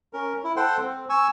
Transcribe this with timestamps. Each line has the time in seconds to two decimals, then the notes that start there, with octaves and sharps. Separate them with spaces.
0.13 C#4 A#4
0.44 E4
0.56 A4 C5 F#5 G5 C6
0.77 C4
1.09 G#5 C#6 E6